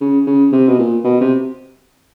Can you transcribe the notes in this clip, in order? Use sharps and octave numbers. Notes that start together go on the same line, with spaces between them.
C#3
C#3
C3
B2
A#2
B2
C3